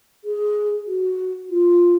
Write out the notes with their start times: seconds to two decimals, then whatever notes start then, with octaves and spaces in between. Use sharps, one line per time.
0.24 G#4
0.87 F#4
1.50 F4